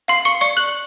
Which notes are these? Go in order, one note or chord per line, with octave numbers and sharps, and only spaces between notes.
F5 C6 C7
C#6 C#7
D5 C#6 C#7
F#6 F#7